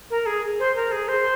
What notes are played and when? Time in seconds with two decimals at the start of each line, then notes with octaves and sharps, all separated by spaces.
0.10 A#4
0.26 G#4
0.60 C5
0.76 A#4
0.92 G#4
1.08 C5